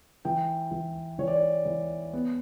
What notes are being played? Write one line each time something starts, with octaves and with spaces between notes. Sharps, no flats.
E3 G5
E3
E3 C#5
D5
C#5
E3
B3